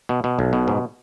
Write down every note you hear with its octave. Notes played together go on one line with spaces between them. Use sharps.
B2
B2
B1
B2
G#2